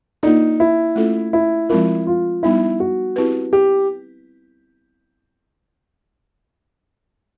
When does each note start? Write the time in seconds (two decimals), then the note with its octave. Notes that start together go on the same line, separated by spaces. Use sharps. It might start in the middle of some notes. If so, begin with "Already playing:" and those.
0.23 A#3 D4 D#4 F4 A4 D5
0.60 E4
0.96 A3 C#4 F4 A4
1.33 E4
1.70 F3 G#3 C4 E4 F4 A#4
2.07 F4
2.43 G3 B3 D#4 E4
2.80 F#4
3.16 C4 E4 G4 B4
3.53 G4